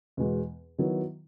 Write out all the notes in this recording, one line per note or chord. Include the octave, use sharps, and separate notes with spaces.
E2 B2 G#3
D#3 F#3 B3 E4